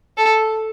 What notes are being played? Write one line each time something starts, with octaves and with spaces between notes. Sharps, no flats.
A4